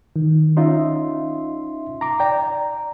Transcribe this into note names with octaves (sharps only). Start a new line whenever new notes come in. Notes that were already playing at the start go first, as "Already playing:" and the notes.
D#3
C#4 D#4 F4 E5 C6
A#5 D6
D5 G5 A#5